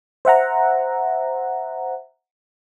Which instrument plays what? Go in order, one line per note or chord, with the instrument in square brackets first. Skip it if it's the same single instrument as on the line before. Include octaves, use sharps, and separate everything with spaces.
[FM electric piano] C5 E5 F#5 A#5